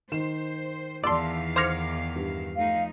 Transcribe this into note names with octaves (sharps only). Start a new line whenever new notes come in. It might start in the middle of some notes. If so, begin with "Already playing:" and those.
D#3 C5 E7
E2 D#3 D5 F5 A5 C6 D6 E6
C5 D6 F6 G#6 A#6 C#7
G2
F3 A3 D#4 F5